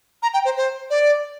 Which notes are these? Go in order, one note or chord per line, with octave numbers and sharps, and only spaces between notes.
A#5
G5
C5
C5
D5